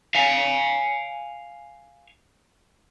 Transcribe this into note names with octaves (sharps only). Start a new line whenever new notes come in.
F5 G#5